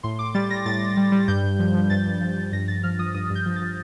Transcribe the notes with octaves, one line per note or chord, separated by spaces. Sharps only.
A2 C6
A2 D6
G3 A6
G3 A#6
A2 A6
A2
G3
G3
G2 G6
G2
F3
F3
G2 A6
G2
F3
F3
G2 A#6
G2 A6
F3 F6
F3 D#6
G2 D#6
G2
G6
F3
A6
F3